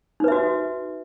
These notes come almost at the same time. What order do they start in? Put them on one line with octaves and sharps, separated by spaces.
D#4 B4 E5 F#4